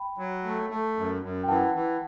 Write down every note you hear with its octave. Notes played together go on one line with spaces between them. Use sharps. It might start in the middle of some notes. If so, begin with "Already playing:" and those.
Already playing: G5 B5
F#3
A3
A3
F#2
F#2
G5
E3 F#5 A5
E3